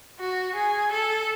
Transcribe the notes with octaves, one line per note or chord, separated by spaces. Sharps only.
F#4
G#4
A4